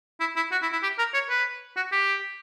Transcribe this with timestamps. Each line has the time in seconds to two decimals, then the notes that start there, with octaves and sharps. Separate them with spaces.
0.20 E4
0.36 E4
0.52 F#4
0.62 E4
0.72 E4
0.83 G4
0.99 A#4
1.14 C#5
1.30 B4
1.76 F#4
1.92 G4